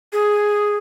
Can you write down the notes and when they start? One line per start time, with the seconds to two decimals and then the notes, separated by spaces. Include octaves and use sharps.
0.13 G#4